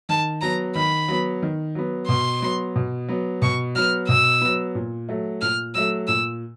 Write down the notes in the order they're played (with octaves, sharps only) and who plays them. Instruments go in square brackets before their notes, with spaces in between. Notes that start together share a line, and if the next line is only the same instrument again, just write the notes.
[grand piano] D#3 [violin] A5
[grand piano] F#3 B3 [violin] A#5
[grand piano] D#3 [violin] B5
[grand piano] F#3 B3
D#3
F#3 B3
[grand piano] B2 [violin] C6
[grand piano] F#3 B3
B2
F#3 B3
[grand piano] B2 [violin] C#6
[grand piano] F#3 B3 [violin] F6
[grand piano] B2 [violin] E6
[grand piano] F#3 B3
A#2
F#3 A3
[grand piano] A#2 [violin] F6
[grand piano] F#3 A3 [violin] E6
[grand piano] A#2 [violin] E6